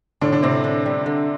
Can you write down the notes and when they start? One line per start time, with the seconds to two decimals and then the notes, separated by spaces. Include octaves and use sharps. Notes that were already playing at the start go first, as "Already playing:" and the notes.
0.21 A2 D3 D4
0.32 D3 D4
0.42 A2 C3 C4
0.64 D4
0.86 G3
1.06 D3